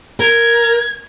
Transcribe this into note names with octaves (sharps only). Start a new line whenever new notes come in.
A#4 G#6